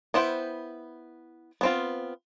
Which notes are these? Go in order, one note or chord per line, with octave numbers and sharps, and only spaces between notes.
B3 E4 C5 F#5 G5
B3 C4 F4